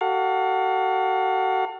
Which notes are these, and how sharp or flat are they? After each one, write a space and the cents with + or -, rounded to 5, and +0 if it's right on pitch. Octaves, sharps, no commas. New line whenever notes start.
F#4 +35 A4 +30 F5 +40